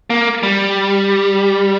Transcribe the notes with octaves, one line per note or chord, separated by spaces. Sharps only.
A#3
G3